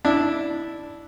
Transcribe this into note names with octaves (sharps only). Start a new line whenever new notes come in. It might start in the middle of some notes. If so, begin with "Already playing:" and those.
D4 E4